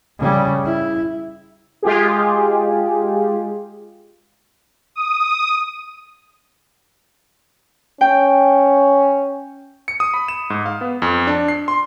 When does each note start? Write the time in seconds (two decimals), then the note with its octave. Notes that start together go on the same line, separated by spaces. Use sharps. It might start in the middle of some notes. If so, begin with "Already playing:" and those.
0.19 C#3 G3
0.65 E4
1.83 G#3 F4 G4 G#4
4.95 D#6
8.01 C#4 G5
9.88 C#7
10.00 D#6
10.14 B5
10.28 E7
10.50 G#2
10.66 F5
10.81 B3
11.02 F2
11.27 D4
11.48 C7
11.68 C6